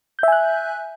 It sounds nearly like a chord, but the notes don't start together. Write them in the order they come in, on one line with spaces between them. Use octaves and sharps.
G6 E5 G#5 F#6